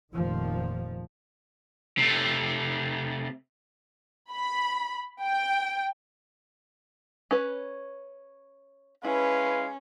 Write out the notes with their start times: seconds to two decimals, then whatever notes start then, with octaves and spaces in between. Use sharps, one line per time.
0.14 F1 A#2 D#3 F3
1.98 C3 A3
4.32 B5
5.23 G5
7.31 C#4 B4
9.04 G#3 C#4 E4 B4 F5